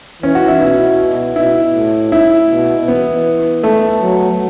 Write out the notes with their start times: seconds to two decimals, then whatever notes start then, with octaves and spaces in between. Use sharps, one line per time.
0.22 E3 C#4
0.35 F#4
0.48 E4
0.60 B2 E4
1.36 B2 E4
1.74 A2
2.12 E4
2.50 B2
2.88 E3 B3
3.63 A3
4.02 F#3